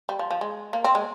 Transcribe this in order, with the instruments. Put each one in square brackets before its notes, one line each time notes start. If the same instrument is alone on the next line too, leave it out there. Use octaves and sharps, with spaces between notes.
[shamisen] G3
F3
F3
G#3
A#3
C4
G#3